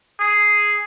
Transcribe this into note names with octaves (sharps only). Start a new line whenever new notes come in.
G#4